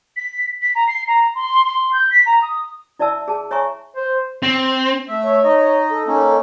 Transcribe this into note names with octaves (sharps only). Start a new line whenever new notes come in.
B6
B6
A#5
C7
A#5
C6
C6
G6
B6
A#5
D#6
E4 D5 E5 A5 E6
G#4 A5
C#5 E5 G#5 A#5 C#6
C5
C4
A3 E5
C#5
D#4 D#5
A4
A#3 C#4 D#4